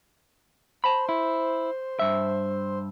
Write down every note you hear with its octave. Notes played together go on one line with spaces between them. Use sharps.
C5 A5 B5
E4
G2 E5